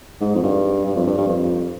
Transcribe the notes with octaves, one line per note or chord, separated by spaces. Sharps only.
G#2
F2
G2
G2
F2
G2
G2
F2